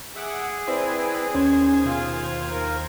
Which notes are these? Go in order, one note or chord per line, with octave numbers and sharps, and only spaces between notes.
G#4 E5 F#5 D6
C4 E4 B4 C5 D5
D#2 C#4 C5 G#6
B2 F4
A#4